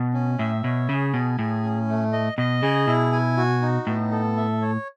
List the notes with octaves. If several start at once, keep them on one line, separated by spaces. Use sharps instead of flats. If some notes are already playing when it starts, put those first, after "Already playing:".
Already playing: B2
C#4
A2 E5
B2 C#5
C#3 G#4
B2 G#5
A2 G#4
C#4
A3
D#5
B2 D#5
C#3 G#4
B2 E4
G#5
F#4
D#4
A2 B3
A4
E5
C#5